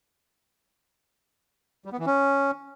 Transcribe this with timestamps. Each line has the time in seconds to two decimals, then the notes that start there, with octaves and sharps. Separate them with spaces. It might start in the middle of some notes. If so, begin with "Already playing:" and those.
1.85 G3
1.92 B3
1.99 E3
2.06 C#4